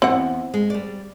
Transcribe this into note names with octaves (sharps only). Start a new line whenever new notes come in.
E2 C4 E4 F#5
G#3
G3 D5